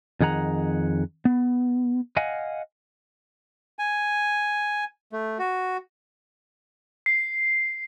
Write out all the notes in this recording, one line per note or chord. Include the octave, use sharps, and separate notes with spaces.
F2 D#3 G#4 F#5 A#5
B3
D#5 F5 F#5 G#5
G#5
A3
F#4
C7